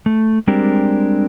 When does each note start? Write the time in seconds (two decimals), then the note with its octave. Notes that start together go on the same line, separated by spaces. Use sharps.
0.06 A3
0.47 G3 G#3 C4 D4 G4 A#4